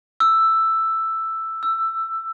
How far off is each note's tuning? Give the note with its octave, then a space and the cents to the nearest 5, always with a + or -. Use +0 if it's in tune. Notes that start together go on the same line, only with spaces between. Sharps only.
E6 +5
E6 +15